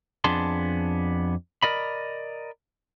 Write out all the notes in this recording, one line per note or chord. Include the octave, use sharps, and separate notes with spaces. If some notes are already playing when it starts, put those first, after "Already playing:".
F2 B3 D4 G#4 A5 C6
A#4 D5 D#5 B5